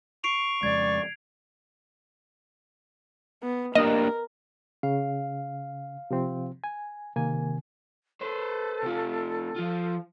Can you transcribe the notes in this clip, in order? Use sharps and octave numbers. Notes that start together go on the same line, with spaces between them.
C#6 C7 D7 F7
F2 C#3 G#3 D5 G#6
B3
A#3 D4 G4 A#4 D#5
C#3 F5
C3 F3 C4
G#5
C3 D#3 A#3 G#5
A4 B4 C5
C3 F4
F3 F4